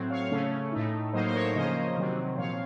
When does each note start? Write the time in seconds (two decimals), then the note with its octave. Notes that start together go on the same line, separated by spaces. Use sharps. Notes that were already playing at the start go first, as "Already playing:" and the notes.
Already playing: A2 F#3 C4
0.10 C#5 F5
0.31 C#3 A3 C#4
0.72 A2 A3 D#4
1.13 A2 F#3 A#3 D#4 C5 D#5
1.26 C5
1.34 A#4 C#5
1.55 C#3 F3 A#3 C#4 C5 D#5
1.97 C3 D#3 F#3 C4
2.37 A#2 F3 C4 C#5 F5